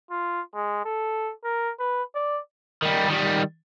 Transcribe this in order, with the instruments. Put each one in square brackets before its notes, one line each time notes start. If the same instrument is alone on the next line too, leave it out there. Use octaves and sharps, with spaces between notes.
[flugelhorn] F4
G#3
A4
A#4
B4
D5
[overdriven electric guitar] D#3 G3
D#3 G3